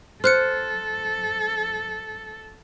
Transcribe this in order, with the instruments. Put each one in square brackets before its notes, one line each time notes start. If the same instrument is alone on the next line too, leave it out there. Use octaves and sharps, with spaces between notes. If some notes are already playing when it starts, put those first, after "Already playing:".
[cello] A4 [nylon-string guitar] C5 [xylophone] F6 F#6 C#7